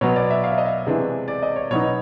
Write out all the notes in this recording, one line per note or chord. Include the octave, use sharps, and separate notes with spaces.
B2 F#3 B3 C#5
D5
E5
F5
E5
D#5
E5
C3 E3 G#3 B3 D4
D5
D#5
C#5
B2 F#3 B3 D#4 C#5